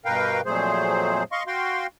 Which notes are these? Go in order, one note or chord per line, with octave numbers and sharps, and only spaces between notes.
G2 B2 A#4 B4 F5 G5
F2 A#2 F#3 A3 G#4 C5
D#5 F5 C6 C#6
F#4 F5 G5 C6